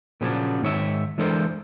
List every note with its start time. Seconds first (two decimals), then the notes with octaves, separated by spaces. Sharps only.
0.21 A#2 C#3 F3 F#3 C#4 D4
0.62 G#2 D#3 C#5 E5
1.18 E3 G#3 D4 A4 A#4 C5